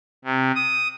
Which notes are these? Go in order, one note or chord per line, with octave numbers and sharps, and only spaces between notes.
C3
D#6